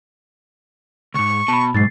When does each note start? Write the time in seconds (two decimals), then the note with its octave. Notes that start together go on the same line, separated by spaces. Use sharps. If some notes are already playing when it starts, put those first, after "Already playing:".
1.14 C#2 G#2 C#6
1.48 B2 A5 B5
1.74 B1 G#2 A6 C7